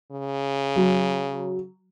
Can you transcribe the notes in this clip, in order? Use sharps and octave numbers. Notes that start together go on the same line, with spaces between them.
C#3
F#3